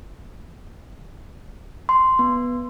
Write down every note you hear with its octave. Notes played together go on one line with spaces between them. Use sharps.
C6
B3